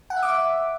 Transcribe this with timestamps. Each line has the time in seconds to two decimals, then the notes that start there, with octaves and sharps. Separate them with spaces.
0.10 F#5
0.16 E5
0.22 D6
0.29 E5